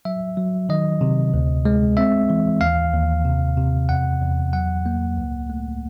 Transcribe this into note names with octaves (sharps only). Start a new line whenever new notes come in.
F#3 E5
F#3
D#3 D#5
C3
D2
G#3
C4 E5
E3
D#2 F5
D#2
C3
C3
E2 F#5
E2
F#3 F#5
A#3
C#2
A3